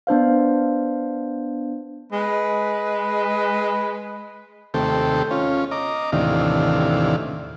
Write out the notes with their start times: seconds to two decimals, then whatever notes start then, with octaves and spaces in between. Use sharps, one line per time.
0.07 B3 D4 C5 F5
2.12 G#3 B4
4.74 D#2 C3 A3 A4 C5 G5
5.31 C#4 F4
5.71 D#5 A#5 D6
6.12 D#2 A2 C3 E3 D4 F5